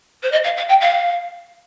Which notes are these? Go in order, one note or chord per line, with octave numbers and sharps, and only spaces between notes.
C5
D#5
F5
F5
G5
F5